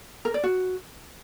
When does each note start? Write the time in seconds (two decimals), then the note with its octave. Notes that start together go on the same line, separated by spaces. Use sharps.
0.25 A#4
0.34 D5
0.44 F#4